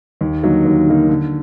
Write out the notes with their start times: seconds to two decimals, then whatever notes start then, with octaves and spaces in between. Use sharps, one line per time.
0.21 D#2
0.43 D3 F#3 A#3 D#4
0.65 D#2
0.87 D3 F#3 A#3 D#4
1.09 D3